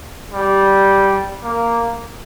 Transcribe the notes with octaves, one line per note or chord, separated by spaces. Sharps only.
G3
A#3